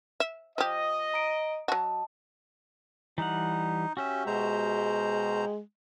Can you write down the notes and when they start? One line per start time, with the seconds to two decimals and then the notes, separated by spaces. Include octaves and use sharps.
0.20 E5
0.58 F3 G4 D#5
1.14 A#5 D7
1.68 F#3 F#4 D#5 A5
3.18 E3 G3 D#4 F#5
3.97 C#4 F#4 G4 E5
4.27 B2 G#3 C5 A#5